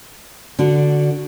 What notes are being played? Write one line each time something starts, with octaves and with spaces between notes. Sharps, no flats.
D3 D4 F#4